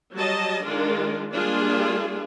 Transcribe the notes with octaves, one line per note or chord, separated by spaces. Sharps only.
F#3 G3 D#5 A5
D#3 G#3 D4 F4
G3 G#3 A#3 D4 F4 G#4